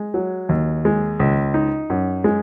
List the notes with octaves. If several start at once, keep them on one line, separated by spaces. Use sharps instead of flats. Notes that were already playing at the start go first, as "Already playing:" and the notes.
Already playing: G#3
F#3
D#2
G#3
C#2
D#4
F#2
G#3